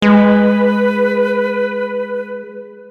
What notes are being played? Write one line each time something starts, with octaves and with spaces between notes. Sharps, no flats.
G#3 B4